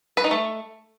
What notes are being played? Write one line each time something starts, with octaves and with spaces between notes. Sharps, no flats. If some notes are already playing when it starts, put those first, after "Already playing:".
B4
D#4
A3